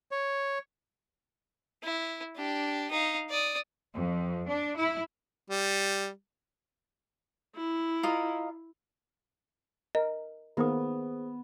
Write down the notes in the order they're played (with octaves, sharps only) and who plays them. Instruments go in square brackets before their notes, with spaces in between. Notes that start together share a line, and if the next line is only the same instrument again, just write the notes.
[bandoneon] C#5
[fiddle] E4
D4 G4
D#4 F5
D5 D#6
[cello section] F2
D4
E4
[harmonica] G3
[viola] E4
[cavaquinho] F4 A#4 D#5
[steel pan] A#4 [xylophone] D#5
[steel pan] D#3 A#3 [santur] B3 [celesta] G#4 C5 D#6